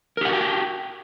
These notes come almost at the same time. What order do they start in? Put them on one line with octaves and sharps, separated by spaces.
A#4 G4 F#5 F#4 G5